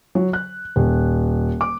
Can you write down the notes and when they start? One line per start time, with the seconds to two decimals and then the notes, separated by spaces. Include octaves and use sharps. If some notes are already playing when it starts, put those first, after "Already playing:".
0.15 F#3
0.33 F#6
0.76 D#1
1.61 D6